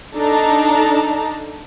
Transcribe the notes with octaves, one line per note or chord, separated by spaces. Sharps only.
D4 D#4 A4 A5 A#5